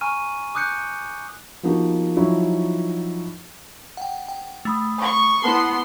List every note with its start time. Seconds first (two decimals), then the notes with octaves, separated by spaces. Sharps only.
0.01 G#5 A#5 C#6 F6 D#7
0.55 D6 D#6 F#6 G6 C#7
1.63 F3 A#3 B3 D#4 F#4 G4
2.16 F3 F#3 D#4 E4 F#4
3.97 F#5 G5
4.28 G5
4.65 A3 B5 D#6
5.01 C#6
5.43 B3 E4 F#5 A5 C6